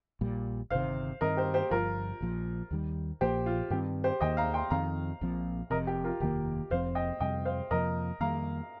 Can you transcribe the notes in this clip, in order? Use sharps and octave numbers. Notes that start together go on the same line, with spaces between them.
A#1 A#2 G3
G1 F2 C3 D#3 C5 F5
G2 D#3 C4 A#4 D#5
G4 C5
G4 C5
G1 G2 F3 F4 A#4
A#1 A#2 F3
D#2 D#3 G3
A#1 A#2 F3 A#3 G4 C5
F4
G2 D#3 C4 G4
G4 C5
D#2 D#3 A#3 D#5 G5
F5 A#5
G5 C6
F2 D#3 C4 F5 A#5
A#1 A#2 F3 C4
F1 F2 C3 A#4 D#5
G4
F4 A#4
F1 D#2 D#3 A#3 G4
F1 F2 F3 C4 C5 F5
D#5 G5
F2 C3 G3 C4 D#5 G5
C5 F5
F2 C3 F3 A#3 A#4 D#5
F2 D#3 G3 A#3 F5 A#5